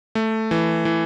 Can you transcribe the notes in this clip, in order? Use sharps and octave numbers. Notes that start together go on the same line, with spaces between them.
A3
E3
E3